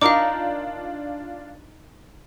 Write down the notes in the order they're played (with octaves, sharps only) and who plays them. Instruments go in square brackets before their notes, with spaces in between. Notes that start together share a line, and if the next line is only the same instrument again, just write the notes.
[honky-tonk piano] D4 F4 [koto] D#4 A#4 [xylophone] F5 D6